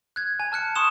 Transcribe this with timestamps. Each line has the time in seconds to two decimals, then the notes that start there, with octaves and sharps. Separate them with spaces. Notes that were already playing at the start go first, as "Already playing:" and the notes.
0.16 F#6 G#6
0.40 G#5
0.52 A5 F6 F#6 C#7
0.76 C6 C#6 D#6 E7